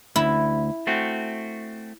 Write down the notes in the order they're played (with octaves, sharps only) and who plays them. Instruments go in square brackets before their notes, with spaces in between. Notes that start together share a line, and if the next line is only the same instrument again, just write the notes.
[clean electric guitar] D2 [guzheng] E4
[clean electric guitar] A3 C4 F#4